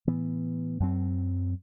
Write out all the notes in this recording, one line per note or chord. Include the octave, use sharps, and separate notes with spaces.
A2 E3 B3
F#2 F#3 C4